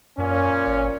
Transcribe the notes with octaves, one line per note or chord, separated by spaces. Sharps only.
F#2 A#2 C#4
G#1